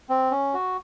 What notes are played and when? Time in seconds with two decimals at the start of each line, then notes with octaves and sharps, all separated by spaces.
0.09 C4
0.31 C#4
0.54 F#4